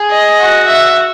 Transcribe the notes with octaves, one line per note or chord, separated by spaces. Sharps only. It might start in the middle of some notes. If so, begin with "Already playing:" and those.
Already playing: G#4
D#5
F#4
E5